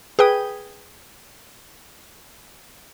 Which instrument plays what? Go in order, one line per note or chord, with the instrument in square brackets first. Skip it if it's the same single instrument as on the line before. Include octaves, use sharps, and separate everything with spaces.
[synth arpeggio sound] G#4 B4 G5 D#6